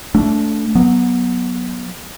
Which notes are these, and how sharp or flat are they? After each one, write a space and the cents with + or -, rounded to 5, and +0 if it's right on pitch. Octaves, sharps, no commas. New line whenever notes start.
A3 +0 D4 -20
F#3 +0 B3 -20